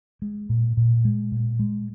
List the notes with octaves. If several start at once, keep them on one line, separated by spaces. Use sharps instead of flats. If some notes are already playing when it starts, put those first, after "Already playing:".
G#3
A#2
A#2
G#3
A#2
G#3